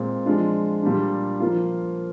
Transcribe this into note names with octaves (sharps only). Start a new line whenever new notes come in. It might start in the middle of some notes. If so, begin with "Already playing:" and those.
Already playing: A#2 G#3 C4
F3 G#3 D4 F4
A#2 G3 D4
F3 A#3 F4